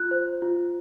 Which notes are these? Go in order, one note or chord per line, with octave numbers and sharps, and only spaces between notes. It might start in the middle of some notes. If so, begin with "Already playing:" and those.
Already playing: F4 F#6
C5
F4